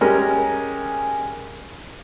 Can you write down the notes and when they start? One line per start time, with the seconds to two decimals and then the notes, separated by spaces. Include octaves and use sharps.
0.01 G3 G#3 C#4 A#4